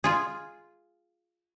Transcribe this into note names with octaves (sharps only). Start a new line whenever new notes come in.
F4 G#4